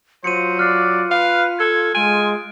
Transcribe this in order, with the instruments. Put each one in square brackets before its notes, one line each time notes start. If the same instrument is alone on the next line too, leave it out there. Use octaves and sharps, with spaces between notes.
[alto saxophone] F#3 [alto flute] F4 [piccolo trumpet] C5 [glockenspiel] C#7 D#7
[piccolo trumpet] D5 [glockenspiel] F6 F#6 C7
[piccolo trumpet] B4 [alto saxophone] F5
[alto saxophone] A4 [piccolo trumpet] G#6
[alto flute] G#3 [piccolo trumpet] F4 [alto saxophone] G#5 [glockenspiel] D7